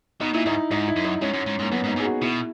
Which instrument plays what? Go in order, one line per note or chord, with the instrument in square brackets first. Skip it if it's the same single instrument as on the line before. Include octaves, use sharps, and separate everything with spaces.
[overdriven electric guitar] B2 [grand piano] D#4
[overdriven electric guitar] A#2 [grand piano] E4
[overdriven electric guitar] G#2 [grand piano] D#4
[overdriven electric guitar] G#2 [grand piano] D#4
[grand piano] E4
[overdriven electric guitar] F#2
[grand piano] D#4
[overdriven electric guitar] G#2 [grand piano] C#4
[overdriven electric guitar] F#2
G#2
[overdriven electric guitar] G#2 [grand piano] A#3
[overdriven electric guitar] F#2 [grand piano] B3
[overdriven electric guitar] G#2
[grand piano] D#4
[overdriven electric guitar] G#2 [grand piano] G#4
[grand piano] F#4
[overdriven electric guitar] B2 [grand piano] E4